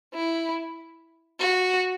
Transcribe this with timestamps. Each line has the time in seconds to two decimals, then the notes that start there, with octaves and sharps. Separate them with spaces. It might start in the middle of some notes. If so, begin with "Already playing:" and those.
0.14 E4
1.40 F#4